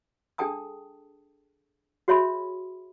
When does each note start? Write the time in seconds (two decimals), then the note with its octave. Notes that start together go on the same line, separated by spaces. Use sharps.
0.38 D4 G#4 A4 G5 A5 D#6
2.08 F#4 G#4 C#5 E5 B5 C6